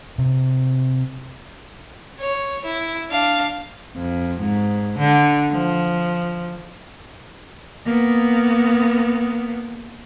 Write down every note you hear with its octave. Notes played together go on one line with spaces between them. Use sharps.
C3
C#5
E4
D4 F5
F2
G#2
D3
F3
A#3 B3